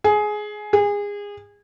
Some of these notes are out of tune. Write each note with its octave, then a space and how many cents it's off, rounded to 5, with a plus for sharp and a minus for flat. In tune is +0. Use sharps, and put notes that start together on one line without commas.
G#4 +15
G#4 -25